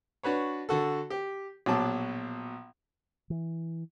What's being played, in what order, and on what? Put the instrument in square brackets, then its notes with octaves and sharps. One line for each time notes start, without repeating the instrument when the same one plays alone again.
[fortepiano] D4 F#4 B4 C#5
D3 F#4 A4
G4
A#1 B2 F#3 A5 D6
[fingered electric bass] E3